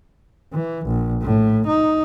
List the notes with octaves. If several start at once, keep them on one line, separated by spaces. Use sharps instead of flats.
E3
A#1
A2
D#4